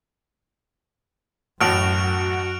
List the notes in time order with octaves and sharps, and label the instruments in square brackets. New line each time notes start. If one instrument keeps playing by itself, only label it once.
[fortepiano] A1 A2 F#5 [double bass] F#2 [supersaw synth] F#4 [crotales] F6 D7 F7